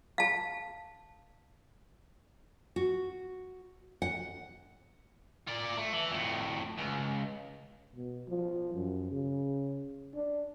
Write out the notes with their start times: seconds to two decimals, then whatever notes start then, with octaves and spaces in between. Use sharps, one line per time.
0.18 F5 A5
2.76 F#4
4.02 F#5
5.47 F4 D5
5.77 A3
5.93 E3
6.12 F2 A2
6.78 C#2
7.95 B2
8.28 F3
8.74 F#2
9.11 C#3
10.14 D4